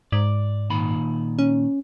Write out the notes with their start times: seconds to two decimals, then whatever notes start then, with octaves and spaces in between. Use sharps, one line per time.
0.12 G#2 D5
0.70 A#2 D#3 B5
1.39 C#4